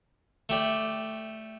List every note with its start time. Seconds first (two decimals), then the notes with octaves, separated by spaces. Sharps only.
0.49 A3 G4 D5